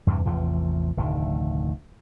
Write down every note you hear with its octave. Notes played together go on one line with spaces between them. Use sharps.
E2 G2 C3 E3
A1 E2 C3 F3
F1 D2 A2 D#3